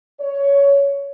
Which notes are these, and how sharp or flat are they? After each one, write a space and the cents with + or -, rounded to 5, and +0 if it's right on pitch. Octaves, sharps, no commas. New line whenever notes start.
C#5 +15